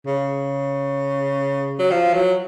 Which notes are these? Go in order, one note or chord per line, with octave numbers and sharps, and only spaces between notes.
C#3
F#3
F3
F#3